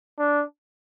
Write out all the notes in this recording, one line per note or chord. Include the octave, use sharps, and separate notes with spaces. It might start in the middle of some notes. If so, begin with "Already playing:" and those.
D4